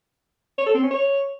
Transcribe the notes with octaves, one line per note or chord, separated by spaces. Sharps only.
C#5
A4
C4
C#4
C#5